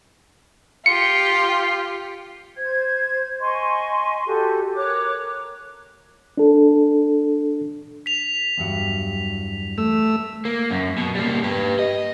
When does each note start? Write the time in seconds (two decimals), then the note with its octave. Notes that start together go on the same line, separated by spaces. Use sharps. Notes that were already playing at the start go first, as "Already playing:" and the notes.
0.86 F4 G4 C#7
2.57 C5 G#6
3.40 D#5 G#5 C6 C#6
4.25 F#4 G4 A4
4.75 A#4 C#5 D6 F#6
6.37 D4 A4
8.06 B6 F7
8.58 E2 G2 F#3
9.78 A3 E6
10.45 A#3
10.71 F#2
10.98 B2
11.15 G3 A#3
11.43 G4 B4
11.79 D#5